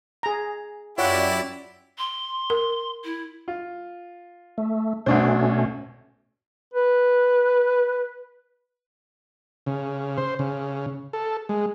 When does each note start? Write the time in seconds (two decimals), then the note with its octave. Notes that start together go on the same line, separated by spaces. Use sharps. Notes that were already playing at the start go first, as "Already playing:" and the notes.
0.23 G#4 A#5
0.98 F#2 E4 F4 G4 C#5 D5 F#5
1.98 C6
2.50 A#4
3.04 E4
3.48 F4
4.58 A3
5.06 B1 B2 A3 C#4 D4 C5
6.74 B4
9.67 C#3
10.18 C5
10.39 C#3
11.13 A4
11.49 G#3